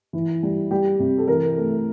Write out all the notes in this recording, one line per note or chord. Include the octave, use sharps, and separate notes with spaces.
E3
G3
G3 G4
C3
A4
E3 A#4
A3